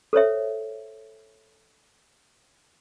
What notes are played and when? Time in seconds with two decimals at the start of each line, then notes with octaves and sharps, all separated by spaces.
0.13 A4 C5 C#5 E5